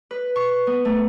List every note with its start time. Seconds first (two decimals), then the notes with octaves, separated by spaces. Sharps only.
0.11 B4
0.36 C#6
0.67 B3
0.85 A3